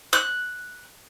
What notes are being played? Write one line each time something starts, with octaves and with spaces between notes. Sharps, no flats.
F#6